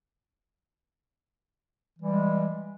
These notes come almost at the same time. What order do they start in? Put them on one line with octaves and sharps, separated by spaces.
E3 G3 G#3